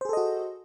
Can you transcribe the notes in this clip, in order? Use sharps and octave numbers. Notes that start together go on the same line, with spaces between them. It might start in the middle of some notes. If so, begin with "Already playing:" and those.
F#4 G#4 A4 C5 D#5